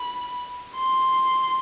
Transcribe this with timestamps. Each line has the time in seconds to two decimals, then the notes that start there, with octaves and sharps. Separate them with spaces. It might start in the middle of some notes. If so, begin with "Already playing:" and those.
Already playing: B5
0.77 C6